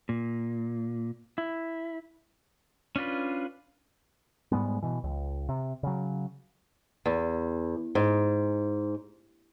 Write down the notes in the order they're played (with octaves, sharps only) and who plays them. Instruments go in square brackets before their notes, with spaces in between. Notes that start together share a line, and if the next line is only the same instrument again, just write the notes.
[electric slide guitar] A#2
E4
[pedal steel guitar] C#4 D4 F4 B4
[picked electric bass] G#2 G3 G#3 B3
B2 E3
C#2
C3
C#3 F#3
[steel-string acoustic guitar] E2
G#2